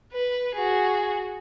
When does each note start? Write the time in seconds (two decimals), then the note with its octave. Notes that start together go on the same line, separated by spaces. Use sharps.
0.13 B4
0.55 F#4 G#4